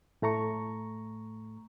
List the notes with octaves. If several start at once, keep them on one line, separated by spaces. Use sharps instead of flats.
A2 A3 A#5 C#6